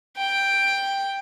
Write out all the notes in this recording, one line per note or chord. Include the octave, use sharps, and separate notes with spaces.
G5